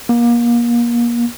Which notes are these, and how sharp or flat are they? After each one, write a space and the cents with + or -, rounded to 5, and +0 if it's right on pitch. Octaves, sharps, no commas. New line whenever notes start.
A#3 +30